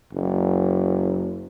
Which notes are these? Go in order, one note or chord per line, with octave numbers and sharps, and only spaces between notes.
F#1